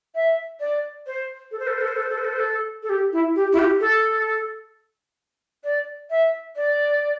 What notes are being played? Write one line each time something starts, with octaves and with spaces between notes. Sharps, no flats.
E5
D5
C5
A4
C5
A4
C5
A4
C5
A4
C5
A4
C5
A4
C5
A4
A4
G4
E4
G4
E4
G4
A4
D5
E5
D5